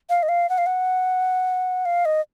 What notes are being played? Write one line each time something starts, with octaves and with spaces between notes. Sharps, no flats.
F5
D#5
F5
F#5
F5
F#5
F5
D#5